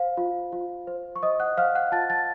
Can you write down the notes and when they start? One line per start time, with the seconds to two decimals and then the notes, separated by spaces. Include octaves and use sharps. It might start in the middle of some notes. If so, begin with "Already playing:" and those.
Already playing: C5 F5
0.17 F4
0.52 F4
0.87 C5
1.16 C#6
1.23 C5 D#5 D#6
1.40 F#5 F#6
1.57 C5 F5 F6
1.75 F#5 F#6
1.92 F4 A5 A6
2.10 A5 A6